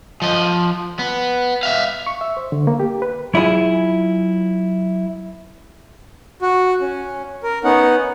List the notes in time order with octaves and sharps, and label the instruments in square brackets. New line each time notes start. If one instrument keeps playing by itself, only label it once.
[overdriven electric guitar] F3 D#5
B3
E5 F5
[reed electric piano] C#6
E5
C5
D3
A#3
G4
B4
[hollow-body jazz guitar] F#3 E4 F4 G#4
[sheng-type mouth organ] F#4
C#4
A#4
B3 C#4 D#4 F#5